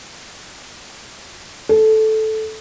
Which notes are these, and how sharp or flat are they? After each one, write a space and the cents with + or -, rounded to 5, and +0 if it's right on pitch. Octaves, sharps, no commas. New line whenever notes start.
A4 -10